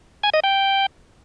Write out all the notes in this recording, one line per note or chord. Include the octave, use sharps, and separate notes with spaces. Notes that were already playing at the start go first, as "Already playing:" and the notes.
G#5
D#5
G5